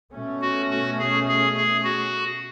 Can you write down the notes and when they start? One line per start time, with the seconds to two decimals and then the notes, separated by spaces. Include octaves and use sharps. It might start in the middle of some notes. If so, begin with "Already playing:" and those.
0.13 B2 A3 C#4
0.42 F#4
0.70 F#4
0.99 G#4
1.28 G#4
1.57 G#4
1.84 F#4